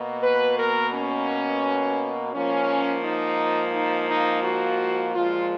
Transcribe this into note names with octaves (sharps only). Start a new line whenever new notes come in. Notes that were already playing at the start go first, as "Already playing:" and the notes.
Already playing: B2 A#3
B4
A#4
C#4
G#2 F3 A#3 C#4
D#4
D#4
D#4
F#4
A#2 F3 G#3 F4